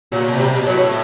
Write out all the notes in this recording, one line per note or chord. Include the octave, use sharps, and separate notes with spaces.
A#2 F#3
B2
C3
G3
B2
F#3
A2